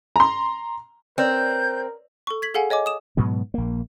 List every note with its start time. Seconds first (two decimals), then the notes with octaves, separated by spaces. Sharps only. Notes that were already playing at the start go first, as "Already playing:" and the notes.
0.16 A#5 C6
1.18 C4 A#4 B4 C#5 D5 G6
2.27 A4 C#6
2.42 G#6 B6 F#7
2.54 G#4 A4 F5 F#5 G#5
2.70 C#5 D#5 G#5 D6
2.86 D#6 E7
3.17 G#2 B2 F#3 B3
3.54 A#1 A#3